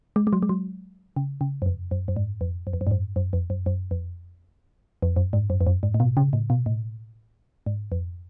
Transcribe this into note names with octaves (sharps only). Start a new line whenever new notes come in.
G#3
G#3
F#3
G#3
F#3
C#3
C#3
F#2
F2
F#2
F#2
G#2
F2
F#2
F2
F#2
G#2
F#2
F#2
F2
F#2
F#2
F2
F2
F#2
G#2
F#2
F2
F#2
G#2
A2
B2
C#3
A2
B2
A2
G#2
F2